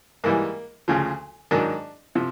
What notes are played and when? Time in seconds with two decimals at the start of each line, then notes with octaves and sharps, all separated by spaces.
0.24 G#2 E3 G3 A#3
0.88 D2 C#3 F3
1.51 G#2 D#3 F#3 D4
2.15 C3 F3